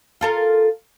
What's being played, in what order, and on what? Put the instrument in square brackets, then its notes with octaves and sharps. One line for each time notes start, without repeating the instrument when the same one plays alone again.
[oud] F4 A4 A#4